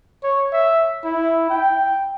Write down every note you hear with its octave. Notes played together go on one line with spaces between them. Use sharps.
C#5
E5
E4
G5